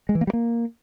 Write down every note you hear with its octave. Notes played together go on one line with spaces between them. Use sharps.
G#3
E3
A#3
G3
A#3